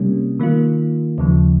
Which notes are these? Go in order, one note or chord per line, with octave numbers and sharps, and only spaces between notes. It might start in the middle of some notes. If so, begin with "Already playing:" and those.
Already playing: C3 G3 A#3 C#4
D#3 A#3 F4
D#2 C#3 F3